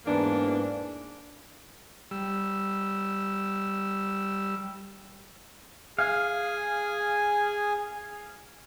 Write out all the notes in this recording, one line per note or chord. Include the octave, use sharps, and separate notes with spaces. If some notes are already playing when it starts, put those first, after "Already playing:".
E2 G#2 E3 A#3 D4
G3 E6
G#4 F5 G#5